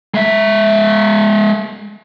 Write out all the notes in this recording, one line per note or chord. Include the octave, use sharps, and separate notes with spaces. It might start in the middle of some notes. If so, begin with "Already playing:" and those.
G#3 E5